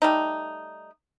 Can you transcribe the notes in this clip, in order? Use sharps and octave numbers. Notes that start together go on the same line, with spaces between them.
G3 A3 D#4